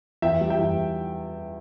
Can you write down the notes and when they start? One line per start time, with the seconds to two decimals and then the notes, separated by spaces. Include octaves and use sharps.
0.22 E2 E5 G5
0.41 G3
0.50 E5 G5
0.59 E2